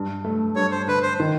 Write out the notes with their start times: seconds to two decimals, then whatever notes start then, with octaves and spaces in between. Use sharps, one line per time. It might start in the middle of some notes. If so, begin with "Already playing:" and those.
Already playing: G2
0.24 A3
0.56 G2 C#5
0.71 C5
0.88 D3 B4
1.03 C5
1.19 D#3